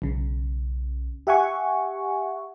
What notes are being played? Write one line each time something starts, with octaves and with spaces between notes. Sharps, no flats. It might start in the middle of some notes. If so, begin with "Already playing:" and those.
B1 C#3
G4 E5 F#5 G#5 C#6